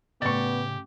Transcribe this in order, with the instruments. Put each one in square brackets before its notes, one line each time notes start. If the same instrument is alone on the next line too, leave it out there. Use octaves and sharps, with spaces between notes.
[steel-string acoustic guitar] A2 C#3 [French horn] B3 [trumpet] G4 [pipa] D5 C#6